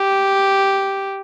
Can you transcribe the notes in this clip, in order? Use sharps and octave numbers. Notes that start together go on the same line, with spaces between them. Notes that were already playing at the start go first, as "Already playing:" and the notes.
Already playing: G4